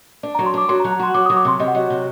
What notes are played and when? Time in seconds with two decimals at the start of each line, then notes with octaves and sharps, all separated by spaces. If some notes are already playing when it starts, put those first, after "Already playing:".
0.23 D4 D5
0.35 F#3 A#5
0.46 C6
0.54 D4 D6
0.69 F#3 C6
0.80 A#5
0.84 F#3
0.92 A#5
1.00 F#4 C6
1.14 F#3 D6
1.26 F#3 D#6
1.37 D6
1.45 C3 C6
1.59 C3 D#5
1.68 F#5
1.75 F#3 D#5
1.90 C3